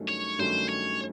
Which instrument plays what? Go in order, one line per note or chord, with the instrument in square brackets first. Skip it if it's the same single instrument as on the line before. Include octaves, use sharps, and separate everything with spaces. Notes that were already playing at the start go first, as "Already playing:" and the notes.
Already playing: [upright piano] G2 D#3 F#3 A3 C#4
[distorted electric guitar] C#5
[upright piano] G2 D#3 F#3 A3 C#4 [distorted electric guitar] C5
[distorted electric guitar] C#5